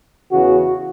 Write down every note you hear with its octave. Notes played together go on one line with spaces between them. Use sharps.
E2 C#3 E3 F#4